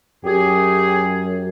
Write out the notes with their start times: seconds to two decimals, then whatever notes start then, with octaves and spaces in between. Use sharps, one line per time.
0.25 F#2 G4 G#4